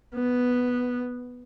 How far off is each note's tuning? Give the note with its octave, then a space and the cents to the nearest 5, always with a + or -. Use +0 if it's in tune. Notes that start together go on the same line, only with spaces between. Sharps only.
B3 +0